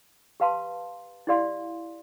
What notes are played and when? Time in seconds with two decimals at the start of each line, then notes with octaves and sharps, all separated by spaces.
0.40 G4 B4 F5 A5 C6
1.27 E4 G4 D5 F5 C6